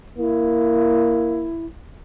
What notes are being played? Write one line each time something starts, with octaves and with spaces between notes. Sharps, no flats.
A#3 E4